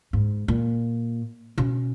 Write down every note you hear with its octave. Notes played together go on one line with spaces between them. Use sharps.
G#2
A#2
B2 C#4